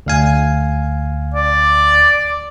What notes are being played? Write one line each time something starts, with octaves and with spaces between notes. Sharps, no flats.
D2 F5 G#5
D5